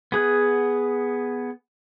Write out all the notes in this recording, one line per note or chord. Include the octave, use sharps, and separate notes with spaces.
B3 G#4 F#5